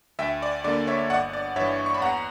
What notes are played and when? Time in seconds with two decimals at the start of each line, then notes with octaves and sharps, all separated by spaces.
0.19 D2 E5 G5
0.42 D5
0.64 D3 A#3 D5
0.87 C#5 E5
1.10 G1 D5 F#5
1.33 D5
1.56 G2 C#5 E5
1.60 E3
1.86 C#6
1.94 B5
2.02 E2 F#5 A#5